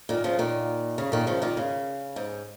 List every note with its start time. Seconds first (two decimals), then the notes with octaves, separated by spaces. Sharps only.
0.09 A#2 D#3
0.24 C#3 F3
0.39 A#2 D#3
0.98 C#3
1.12 A#2 D#3
1.27 C#3 F3
1.42 A#2 D#3
1.57 C#3
2.16 G#2